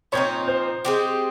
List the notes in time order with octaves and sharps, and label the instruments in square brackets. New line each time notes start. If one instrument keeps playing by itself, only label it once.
[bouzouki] A#2 F3 C4 D#4 [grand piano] C#5
[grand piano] C5
[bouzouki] G#3 C4 G4